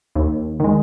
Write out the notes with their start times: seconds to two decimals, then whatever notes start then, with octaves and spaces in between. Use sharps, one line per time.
0.15 D#2
0.60 D#3 G#3